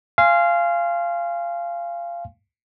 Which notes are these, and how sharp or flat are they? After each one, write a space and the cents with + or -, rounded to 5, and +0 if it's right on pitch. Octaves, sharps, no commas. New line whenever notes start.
F5 -20 G#5 +0 C6 +20